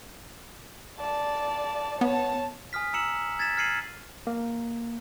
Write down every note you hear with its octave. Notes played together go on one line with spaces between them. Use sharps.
D5 A5
B3 C#5 A5
G#5 D#6 F6 B6
A#5 E6 C#7 E7 F#7
G#6 A6 B6 E7
F6 G#6 C7 C#7 D#7 F#7
A#3